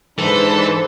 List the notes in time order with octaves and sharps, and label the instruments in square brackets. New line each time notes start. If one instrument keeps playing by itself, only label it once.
[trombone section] G#2 D4 [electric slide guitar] E3 [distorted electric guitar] A4 [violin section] B4 C5